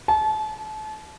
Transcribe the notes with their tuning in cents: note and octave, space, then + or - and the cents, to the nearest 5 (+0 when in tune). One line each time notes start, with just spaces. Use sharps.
A5 -35